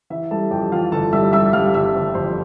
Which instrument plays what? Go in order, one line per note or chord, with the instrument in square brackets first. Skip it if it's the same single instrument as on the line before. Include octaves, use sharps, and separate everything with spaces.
[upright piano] E3 E4 E5
G3 A4 A5
F2 G4 G5
E3 F4 F5
G1 A4 A5
G3 E5 E6
G3 E5 E6
G3 F5 F6
G1 E5 E6
G1
F2 C5 C6